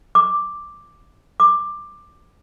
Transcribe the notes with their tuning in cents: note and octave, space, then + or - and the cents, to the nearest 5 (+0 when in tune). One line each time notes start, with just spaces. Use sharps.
D6 +5
D6 +15